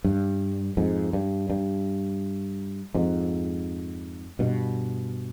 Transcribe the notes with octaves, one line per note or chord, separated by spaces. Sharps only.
G2
F2 G#2
G2
G2
F2 G#2
G2 B2